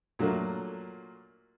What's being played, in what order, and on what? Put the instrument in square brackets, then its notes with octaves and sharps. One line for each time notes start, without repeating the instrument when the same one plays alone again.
[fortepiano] A#2 F#3 A3 A#3